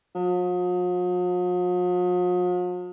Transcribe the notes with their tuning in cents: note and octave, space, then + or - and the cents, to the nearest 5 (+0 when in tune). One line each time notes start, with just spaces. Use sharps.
F3 +45